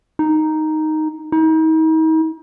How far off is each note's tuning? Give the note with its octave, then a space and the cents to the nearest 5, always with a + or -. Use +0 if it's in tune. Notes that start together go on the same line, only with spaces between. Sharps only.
D#4 +0
D#4 +40